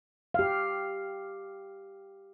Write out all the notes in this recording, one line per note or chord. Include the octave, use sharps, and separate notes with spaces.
G4 F5